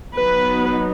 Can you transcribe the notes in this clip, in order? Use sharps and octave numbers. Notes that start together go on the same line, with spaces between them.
F#3 B3 D#4 B4